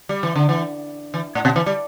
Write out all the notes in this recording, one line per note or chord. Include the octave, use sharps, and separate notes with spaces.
G3
E3
D3
E3
E3
A2
B2
E3
G3